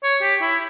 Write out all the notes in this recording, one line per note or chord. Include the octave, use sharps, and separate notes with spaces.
C#5
G4
E4